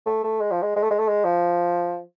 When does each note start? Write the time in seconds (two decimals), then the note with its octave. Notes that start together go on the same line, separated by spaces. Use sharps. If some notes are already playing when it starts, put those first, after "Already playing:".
0.06 A3
0.24 A3
0.40 G#3
0.51 F3
0.62 G#3
0.76 G#3
0.83 A3
0.90 G#3
0.99 A3
1.08 G#3
1.24 F3